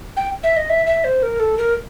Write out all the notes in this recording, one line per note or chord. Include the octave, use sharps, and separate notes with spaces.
G5
E5
D#5
E5
E5
C5
A#4
A4
A#4